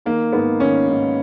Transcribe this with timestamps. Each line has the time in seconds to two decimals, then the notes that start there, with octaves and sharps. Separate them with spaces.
0.06 D#3 A#3
0.33 G#2 B3
0.60 D#3 C#4
0.88 G#2